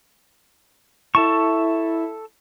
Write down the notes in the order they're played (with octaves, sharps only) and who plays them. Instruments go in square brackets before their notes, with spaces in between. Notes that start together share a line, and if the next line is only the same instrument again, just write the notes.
[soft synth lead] E4 [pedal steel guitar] A4 A5 C#6